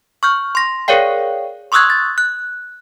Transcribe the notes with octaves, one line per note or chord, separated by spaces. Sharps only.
C#6 F6 G6
C6 A#6
G#4 A#4 C#5 D5 F5 G5
C6 C#6 D#6 E6 F#6 G#6
A6
F#6